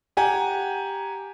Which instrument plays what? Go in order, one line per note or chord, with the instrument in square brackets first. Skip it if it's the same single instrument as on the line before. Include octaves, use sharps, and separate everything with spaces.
[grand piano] G4 F#5 G#5 A#5